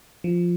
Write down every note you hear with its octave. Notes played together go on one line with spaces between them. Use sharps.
F3